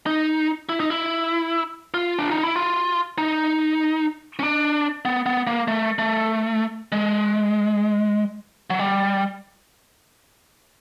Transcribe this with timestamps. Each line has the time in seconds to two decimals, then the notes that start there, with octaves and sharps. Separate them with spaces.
0.06 D#4
0.69 E4
0.80 D#4
0.90 E4
1.94 F4
2.19 D4
2.31 D#4
2.43 E4
2.56 F4
3.18 D#4
4.39 C#4
4.43 D4
5.05 B3
5.26 B3
5.47 A#3
5.68 A3
5.99 A3
6.92 G#3
8.70 F#3
8.79 G3